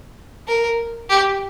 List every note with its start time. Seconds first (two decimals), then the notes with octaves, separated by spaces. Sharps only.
0.48 A#4
1.09 G4